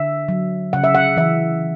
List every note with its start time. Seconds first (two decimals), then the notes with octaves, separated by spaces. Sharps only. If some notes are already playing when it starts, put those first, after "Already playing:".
Already playing: D3 D4 E5
0.28 F#3
0.73 C#3 F#5
0.84 E5
0.95 F#5
1.17 E3 E5